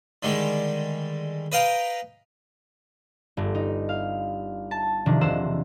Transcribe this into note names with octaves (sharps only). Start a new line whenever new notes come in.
D3 D#3 G3 G#3
B4 D#5 F5 G5 A#5
G1 G2
D#4
F5
A5
C3 D#3 F3 D4
E1 C5 F#5 E6 E7